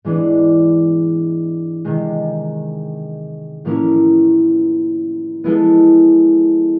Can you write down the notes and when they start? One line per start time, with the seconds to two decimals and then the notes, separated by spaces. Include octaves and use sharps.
0.05 G#2 E3 G#3 B3 D4
1.85 C3 D#3 G#3
3.65 A2 F3 A#3 C#4 E4
5.44 F3 G#3 B3 E4 A4